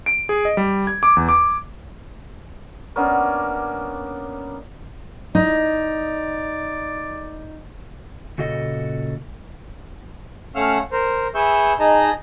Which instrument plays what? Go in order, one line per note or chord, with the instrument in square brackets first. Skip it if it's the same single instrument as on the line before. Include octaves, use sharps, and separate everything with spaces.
[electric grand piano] D7
G#4
D#5
G3
G#6
D6
E2
D6
[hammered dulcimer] A#3 B3 C#4 D4
[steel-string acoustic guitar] D#4 [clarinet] D5
[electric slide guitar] A#2 C#3 F#4 A4 D#5
[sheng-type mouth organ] A3 C#4 F5 F#5 E6 F6
A#4 C5
G#4 B4 E5 C#6 E6 G6
D#4 G#4 D#5 A5 A#5